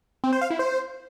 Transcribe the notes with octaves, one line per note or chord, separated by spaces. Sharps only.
C4
C5
F5
E4
C5